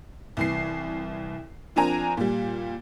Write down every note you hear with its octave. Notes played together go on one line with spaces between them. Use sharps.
C2 E3 C7
F3 C4 D4 A#4 G#5 A#5
A#2 G3